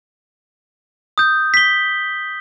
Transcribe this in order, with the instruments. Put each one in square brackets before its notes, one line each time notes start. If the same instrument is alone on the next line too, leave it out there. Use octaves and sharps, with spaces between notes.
[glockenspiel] D#6 G6
B6 G7